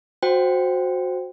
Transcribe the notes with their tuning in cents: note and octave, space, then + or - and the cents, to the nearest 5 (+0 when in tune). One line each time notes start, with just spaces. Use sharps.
F#4 -15 C5 +0 G5 +0